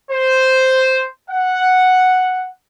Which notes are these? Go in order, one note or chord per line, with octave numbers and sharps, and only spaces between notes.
C5
F#5